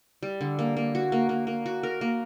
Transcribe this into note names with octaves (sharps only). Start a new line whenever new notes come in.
G3
D3
A#3
A#3
F#4
A#3
A#3
A#3
F#4
A#4
A#3